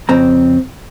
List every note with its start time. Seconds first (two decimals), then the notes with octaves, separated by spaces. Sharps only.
0.09 F2 C#3 C4 A#5